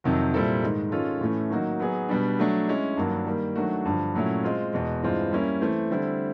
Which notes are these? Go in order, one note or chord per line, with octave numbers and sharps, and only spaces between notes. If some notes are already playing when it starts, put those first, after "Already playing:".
F2 C3 D#3 F#3
A#2 G3 C4 E4 A4
G#2 D#3 G#3
D#3 G#3 C#4 F4 A4
A2 E3 A3 C#4
D#3 F#3 A#3 D#4 F#4
F#3 B3 D#4 G#4
B2 G3 B3 D4
F#3 A3 D4
G#3 C#4 E4
G2 D#3 F#3 A#3 D4
D#3 G3 A#3
D#3 F#3 A3 D4 F#4
G2 D3 F3
A#2 F#3 A3 C#4 E4
G#3 C4 F4
E2 B2 G#3
G2 E3 G#3 C4 F4
G3 A#3 C#4 E4
E3 A3 C4
D3 G3 C4 E4 A4